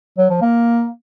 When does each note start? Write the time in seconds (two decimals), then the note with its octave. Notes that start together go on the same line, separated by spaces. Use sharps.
0.18 F#3
0.30 F3
0.41 A#3